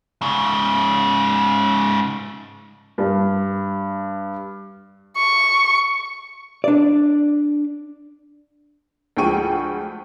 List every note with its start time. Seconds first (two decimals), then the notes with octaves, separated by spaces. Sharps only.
0.21 G#2 C#3
2.98 G2
5.17 C#6
6.64 D4 D5
9.17 D2 F3 G#3 G5 C#6 D#7